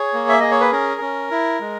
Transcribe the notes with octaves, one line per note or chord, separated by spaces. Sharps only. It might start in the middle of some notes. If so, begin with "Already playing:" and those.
Already playing: G#4 C#5
A#3
E5
G#4 D#5
C#5
B4
C#4 A#4
C#4
E4
G#3